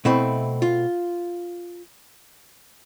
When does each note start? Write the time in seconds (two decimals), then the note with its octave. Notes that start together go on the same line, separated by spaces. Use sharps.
0.05 B2 A3 C4 E4
0.62 F4